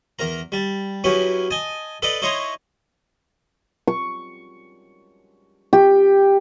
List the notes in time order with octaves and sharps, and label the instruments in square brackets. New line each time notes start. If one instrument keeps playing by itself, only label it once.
[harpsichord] E2 A#4 A#5
G3 A5
F#3 B3 C#4 E4 G4
D#5 G#5 A5
A4 B4 D5 D#5 A5
D#4 E4 C#5 A#5 C6 D#6
[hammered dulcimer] C#6
G4